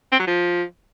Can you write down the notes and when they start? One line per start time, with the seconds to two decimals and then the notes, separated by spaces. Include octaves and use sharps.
0.12 C4
0.20 F#3
0.27 F3